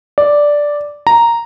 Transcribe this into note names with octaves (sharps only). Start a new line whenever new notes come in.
D5
A#5